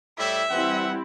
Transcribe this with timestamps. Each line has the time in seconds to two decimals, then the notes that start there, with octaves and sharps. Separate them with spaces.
0.18 A2 G3 E4 E5
0.50 E3 G3 C4 E4 F#5